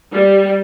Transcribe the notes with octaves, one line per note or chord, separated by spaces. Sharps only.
G3